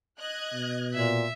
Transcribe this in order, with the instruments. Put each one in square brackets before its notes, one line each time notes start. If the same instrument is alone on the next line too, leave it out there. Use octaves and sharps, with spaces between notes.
[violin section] D#5 F#6 G#6
[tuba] B2
[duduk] A#2 [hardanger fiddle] E5